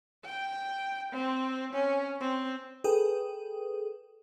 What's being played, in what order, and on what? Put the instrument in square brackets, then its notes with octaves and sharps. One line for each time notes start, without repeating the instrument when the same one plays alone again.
[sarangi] G5
C4
C#4
C4
[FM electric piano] G#4 A4 B4 G5 D#6